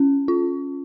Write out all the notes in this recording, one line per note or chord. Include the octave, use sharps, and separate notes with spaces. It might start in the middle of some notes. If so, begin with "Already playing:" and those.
Already playing: C#4
F4